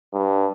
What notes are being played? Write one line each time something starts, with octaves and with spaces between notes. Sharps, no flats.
G2